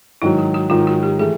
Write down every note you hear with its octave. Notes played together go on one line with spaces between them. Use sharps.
G#2 D#3 F#3 E4
F#4
F#4
G#2 D#3 F#3 F4
F#4
G4
E3 A3 G#4